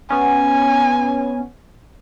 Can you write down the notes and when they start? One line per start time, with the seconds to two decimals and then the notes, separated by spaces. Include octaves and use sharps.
0.10 B3 C#4 G#5